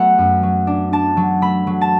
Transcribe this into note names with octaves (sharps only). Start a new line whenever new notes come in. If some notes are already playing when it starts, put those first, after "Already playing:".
Already playing: F#3 A3 B3 E5 F#5
F#2
F#3
D4
D4 A5
F#3
A3 B5
F#3
A5